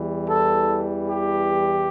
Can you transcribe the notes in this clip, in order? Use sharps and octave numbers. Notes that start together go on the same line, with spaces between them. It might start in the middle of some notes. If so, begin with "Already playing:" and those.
Already playing: E2 E3 G3
A4
G4